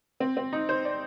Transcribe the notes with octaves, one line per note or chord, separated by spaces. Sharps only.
C4
C4
D#4
C5
D5